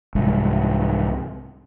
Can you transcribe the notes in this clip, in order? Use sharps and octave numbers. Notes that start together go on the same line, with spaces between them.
C2 G#2